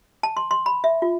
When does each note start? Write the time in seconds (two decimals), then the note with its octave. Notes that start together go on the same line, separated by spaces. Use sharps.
0.23 A5
0.37 C6
0.51 C6
0.66 B5
0.84 E5
1.02 F4